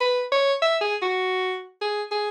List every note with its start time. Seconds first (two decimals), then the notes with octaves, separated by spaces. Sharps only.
0.01 B4
0.32 C#5
0.62 E5
0.81 G#4
1.02 F#4
1.81 G#4
2.11 G#4